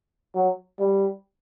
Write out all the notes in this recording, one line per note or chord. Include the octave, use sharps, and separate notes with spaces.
F#3
G3